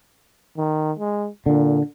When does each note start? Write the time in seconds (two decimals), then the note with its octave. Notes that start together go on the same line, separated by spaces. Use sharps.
0.57 D#3
0.99 G#3
1.46 A#2 D3